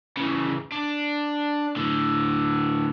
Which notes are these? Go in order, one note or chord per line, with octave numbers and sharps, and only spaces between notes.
C#3 E3
D4
A2 D3